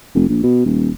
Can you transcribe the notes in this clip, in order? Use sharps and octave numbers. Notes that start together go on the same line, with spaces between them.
F1
A#1
B2
D#1